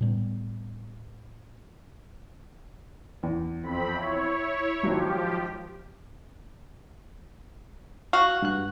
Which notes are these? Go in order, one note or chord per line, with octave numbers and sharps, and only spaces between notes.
A2 G3 B3
E2
F2 C4 B5
E4 C#5
G#1 F3 F#3 G4
F#4 F5
G2 F#6